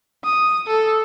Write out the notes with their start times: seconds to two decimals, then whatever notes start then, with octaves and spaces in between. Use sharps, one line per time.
0.25 D#6
0.67 A4